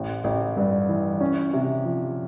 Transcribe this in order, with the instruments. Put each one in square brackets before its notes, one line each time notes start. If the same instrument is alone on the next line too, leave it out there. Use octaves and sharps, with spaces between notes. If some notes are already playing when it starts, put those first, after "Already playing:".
Already playing: [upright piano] A1
A1
G2
E3
C#4
C3
F3